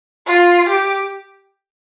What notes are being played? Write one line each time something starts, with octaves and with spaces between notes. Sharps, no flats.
F4
G4